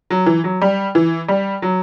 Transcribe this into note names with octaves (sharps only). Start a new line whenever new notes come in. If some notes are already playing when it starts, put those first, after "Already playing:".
F#3
E3
F#3
G3
E3
G3
F#3